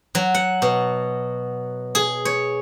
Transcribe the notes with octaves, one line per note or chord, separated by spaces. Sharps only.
F#3
F#5
B2
G#4
C#5